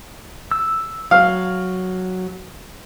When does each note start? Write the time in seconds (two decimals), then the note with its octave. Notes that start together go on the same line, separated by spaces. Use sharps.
0.51 E6
1.11 F#3 F5